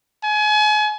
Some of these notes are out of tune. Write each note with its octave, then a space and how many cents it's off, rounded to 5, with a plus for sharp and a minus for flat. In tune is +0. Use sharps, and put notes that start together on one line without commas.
G#5 +35